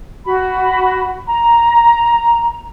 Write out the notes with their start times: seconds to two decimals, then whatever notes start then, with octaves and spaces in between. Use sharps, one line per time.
0.25 F#4 B5
1.28 A#5